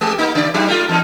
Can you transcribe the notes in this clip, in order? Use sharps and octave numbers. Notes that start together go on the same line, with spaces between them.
G#3 G4
A#3 D#4
C#3 D5
F#3 D#4 G4
G3 A3 F4
E2 D#4